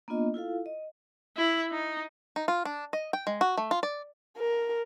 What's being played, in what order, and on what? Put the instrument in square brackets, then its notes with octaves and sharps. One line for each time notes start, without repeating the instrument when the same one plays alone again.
[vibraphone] A#3 B3 D4 F4 D#5
E4 F4 A4 F5
D#5
[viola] E4
D#4
[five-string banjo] D#4
F4
D4
D#5
G5
G#3
F#4
A3
F4
D5
[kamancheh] A#4